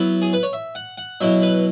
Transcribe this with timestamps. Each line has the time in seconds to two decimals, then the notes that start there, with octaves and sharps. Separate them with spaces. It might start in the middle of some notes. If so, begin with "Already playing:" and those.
Already playing: F#3 B3 E4 E5
0.22 G#4
0.33 B4
0.43 C#5
0.53 E5
0.75 F#5
0.97 F#5
1.21 B2 F#3 E4 E5
1.43 B4